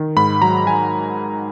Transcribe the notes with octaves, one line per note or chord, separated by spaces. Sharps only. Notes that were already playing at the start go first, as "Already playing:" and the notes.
Already playing: D#3
G#2 B5
F#3 A#5
F#3 G#5